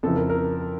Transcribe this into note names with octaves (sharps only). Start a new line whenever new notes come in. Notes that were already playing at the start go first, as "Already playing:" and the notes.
F2 C#3 E3 A4
A#4
A#4